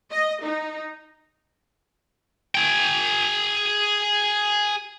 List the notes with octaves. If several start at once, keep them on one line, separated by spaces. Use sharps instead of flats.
D#5
D#4
G#4 G5